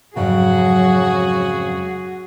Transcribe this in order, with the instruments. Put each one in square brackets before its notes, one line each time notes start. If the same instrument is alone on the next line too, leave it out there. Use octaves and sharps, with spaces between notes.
[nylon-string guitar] F2 G#2 C#3 [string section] F#3 [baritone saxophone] F#4 [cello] G#4